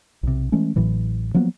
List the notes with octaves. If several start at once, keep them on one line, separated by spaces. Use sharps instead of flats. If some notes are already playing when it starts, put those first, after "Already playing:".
B1 C3
E3 G#3 A3 C#4
A1 A2 E3 F#3
F3 F#3 A#3 B3